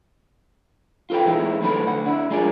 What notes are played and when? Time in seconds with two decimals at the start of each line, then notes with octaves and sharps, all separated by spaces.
1.10 F4 A4 B4 G5
1.26 E3 G#3 B3 D#4 E4
1.62 D2 D3 F#3 A4 B4 B5
1.84 D2 F#5
2.06 D4 E4
2.31 G#3 F4 G#4 A#4 D5